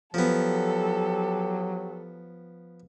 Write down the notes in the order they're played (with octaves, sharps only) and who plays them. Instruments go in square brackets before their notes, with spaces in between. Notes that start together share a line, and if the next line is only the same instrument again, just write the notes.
[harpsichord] F3 B3 [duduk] F#3 [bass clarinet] G4 [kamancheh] A4